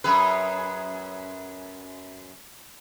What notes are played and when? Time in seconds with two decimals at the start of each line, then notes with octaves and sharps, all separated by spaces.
0.04 F#2 G#4 B4